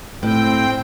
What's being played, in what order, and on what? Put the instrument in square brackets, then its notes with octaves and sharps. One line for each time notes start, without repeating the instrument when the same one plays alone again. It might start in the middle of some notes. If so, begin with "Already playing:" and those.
[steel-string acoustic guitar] A2 [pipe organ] C4 G5